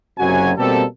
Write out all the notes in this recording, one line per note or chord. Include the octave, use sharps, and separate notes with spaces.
F#1 F#2 C3 F#3 F#4 G#5
B2 G3 A#3 C4 G4 A4